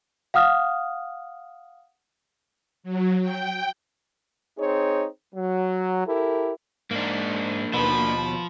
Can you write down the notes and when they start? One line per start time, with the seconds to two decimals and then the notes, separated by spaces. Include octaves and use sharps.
0.34 F5 F#5 D#6 F6
2.83 F#3
3.22 G5
4.59 C4 D#4 G#4 C#5
5.34 F#3
6.06 E4 G4 A4 A#4
6.91 G#2 A#3 D4
7.73 D#2 B2 F3 B5